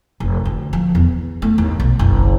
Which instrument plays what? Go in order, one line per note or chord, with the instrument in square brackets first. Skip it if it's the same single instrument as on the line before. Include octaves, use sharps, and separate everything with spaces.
[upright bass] F1
D2
F3
E2
A3
D#2
B1
F#1